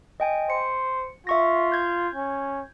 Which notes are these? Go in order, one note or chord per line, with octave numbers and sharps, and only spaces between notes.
D#5 G5 G#5
C5 C#7
F4 E5 C#6 A#6
G6 G#6
C#4